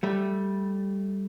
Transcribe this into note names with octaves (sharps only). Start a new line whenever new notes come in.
G3 A3